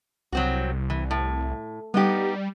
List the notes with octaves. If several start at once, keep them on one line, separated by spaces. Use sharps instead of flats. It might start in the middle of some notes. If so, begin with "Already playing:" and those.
C2 F#3 C4 F#4
E3
A2
G3 B3 D#4 G4